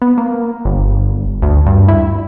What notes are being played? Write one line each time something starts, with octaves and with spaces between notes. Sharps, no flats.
B3
A#3
G1
D2
G2
E4